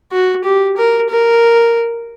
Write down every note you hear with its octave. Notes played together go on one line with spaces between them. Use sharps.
F#4
G4
A#4
A#4